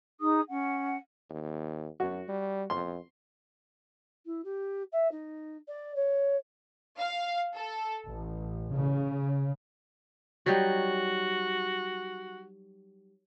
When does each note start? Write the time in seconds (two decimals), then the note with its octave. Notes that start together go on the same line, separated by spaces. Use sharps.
0.19 D#4 G#4 D#6
0.49 C#4 F#5
1.30 D#2
2.00 F#2 F#4
2.29 G3
2.70 F2 C6
4.25 E4
4.44 G4
4.92 E5
5.11 D#4
5.67 D5
5.95 C#5
6.98 F5
7.54 A4
8.06 A1
8.71 C#3
10.46 F#3 G3 D#4 F#4